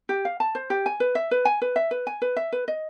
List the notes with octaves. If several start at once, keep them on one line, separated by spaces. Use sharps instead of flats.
G4
F5
A5
C5
G4
G#5
B4
E5
B4
G#5
B4
E5
B4
G#5
B4
E5
B4
D#5